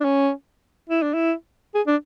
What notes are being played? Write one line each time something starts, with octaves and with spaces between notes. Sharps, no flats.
D4
C#4
E4
D4
E4
G#4
D4